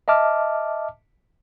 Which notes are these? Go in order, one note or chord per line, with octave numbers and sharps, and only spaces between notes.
D#5 E5 A5 D6 F6